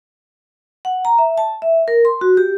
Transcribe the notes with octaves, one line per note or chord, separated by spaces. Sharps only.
F#5
A#5
E5
A5
E5
A#4
C6
F#4
G4